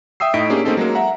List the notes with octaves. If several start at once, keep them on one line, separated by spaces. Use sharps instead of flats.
E5 G5 D#6 E6 C7
A2 D#4 D#5 B6 D7
A#3 C#4 D4 G4 G#4
A3 A#3 C4 C#4 D#4 A4
F#3 G#3 A#3
E5 F#5 A#5